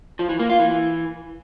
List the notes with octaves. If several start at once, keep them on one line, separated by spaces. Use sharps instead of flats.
F3
E3
A#3
F4
E3